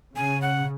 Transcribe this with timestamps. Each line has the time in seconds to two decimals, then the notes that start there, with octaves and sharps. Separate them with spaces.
0.16 C#3 G#5
0.42 F#5